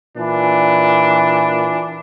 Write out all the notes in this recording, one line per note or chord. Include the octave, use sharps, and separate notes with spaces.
A#2 E3 D4